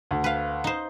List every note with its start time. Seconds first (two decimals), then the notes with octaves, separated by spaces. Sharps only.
0.11 D2
0.24 B4 F5
0.64 D#4 C5